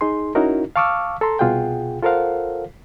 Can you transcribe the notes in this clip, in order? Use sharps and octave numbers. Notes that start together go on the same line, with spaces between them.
D#4 G#4 C6
C#4 D#4 E4 F#4 A#4
F5 A5 C#6 D6 E6 F6
A4 A#5 C6
C2 B2 F4 G#4 F#5 G5
F4 A4 A#4 C5 F5 F#5